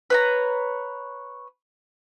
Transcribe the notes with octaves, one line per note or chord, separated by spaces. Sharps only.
B4 C#5 A#5